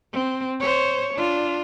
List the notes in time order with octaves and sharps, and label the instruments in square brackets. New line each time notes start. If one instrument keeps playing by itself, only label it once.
[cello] C4
C5 C#5
D4 F4